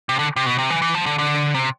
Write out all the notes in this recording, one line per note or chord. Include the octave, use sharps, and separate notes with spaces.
C3
D3
C3
B2
C3
E3
E3
F3
D3
D3
C3